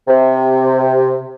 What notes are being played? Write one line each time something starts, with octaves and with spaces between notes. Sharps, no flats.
C3